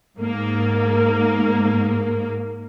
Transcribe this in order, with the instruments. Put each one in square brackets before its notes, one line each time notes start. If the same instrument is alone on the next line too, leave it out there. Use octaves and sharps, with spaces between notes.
[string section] G#2 A#3